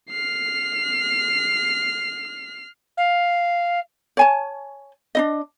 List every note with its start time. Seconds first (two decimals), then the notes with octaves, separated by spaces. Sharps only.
0.10 F6 C7
2.97 F5
4.17 C#5 G#5 A5
5.15 D4 D#4 D#5